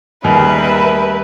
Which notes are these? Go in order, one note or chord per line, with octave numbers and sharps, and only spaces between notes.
D#2 G3 A#3 C#4 G#4 A#4 B4 E5